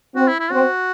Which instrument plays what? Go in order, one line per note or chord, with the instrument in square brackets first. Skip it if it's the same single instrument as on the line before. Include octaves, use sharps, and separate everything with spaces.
[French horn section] C4 [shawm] F#4
[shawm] E4
E4
[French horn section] C4 [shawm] F#4